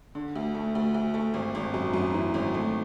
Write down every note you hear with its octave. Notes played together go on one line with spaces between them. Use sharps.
D3
D2
A3
D2
D2
A3
G#1
G#1
F#2
F#2
E3
G#1
A3